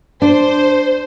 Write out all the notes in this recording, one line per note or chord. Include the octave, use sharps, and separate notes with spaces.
D4 C5